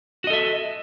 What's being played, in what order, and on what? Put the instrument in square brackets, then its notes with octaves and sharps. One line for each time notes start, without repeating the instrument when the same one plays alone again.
[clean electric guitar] F#4
D#5
A4
E5